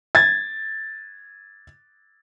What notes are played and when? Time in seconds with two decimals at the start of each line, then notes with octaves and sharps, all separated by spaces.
0.15 G#6 A6